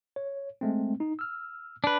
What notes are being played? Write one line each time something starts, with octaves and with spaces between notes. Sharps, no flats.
C#5
G#3 A3 C4
D#4
E6 F6
D4 B4